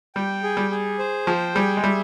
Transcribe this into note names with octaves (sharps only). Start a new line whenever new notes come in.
G3 G5
G#4
G3
G#4
C5
F3 G5
G3 G#4
G#3
G3 E5